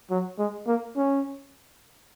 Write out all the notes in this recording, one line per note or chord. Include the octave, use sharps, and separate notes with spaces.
F#3
G#3
A#3
C#4